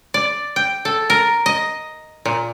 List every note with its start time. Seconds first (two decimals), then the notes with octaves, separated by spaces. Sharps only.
0.14 D5
0.56 G5
0.85 A4
1.10 A#4
1.46 D#5
2.25 A#2